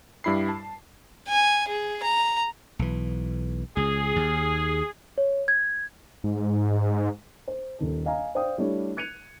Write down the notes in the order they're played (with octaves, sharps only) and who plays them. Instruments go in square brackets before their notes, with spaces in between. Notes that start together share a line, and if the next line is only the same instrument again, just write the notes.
[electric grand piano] G2 G3 E4 B5 C7
A5
[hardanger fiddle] G#5
G#4
A#5
[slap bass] B1 E3
[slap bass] C#2 [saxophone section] G#4
[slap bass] D#2
[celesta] C#5
G#6
[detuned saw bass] G#2
[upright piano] C5
D#1 D#3 A4
D#5 F5 G#5 A#5
C5 D5 F5 G5 D#6
G3 A3 D4 E4 C#5
F#6 G#6 C#7 D#7 F7